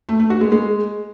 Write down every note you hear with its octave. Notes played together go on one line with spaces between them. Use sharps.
A3
A3
F#4
G#3
G#3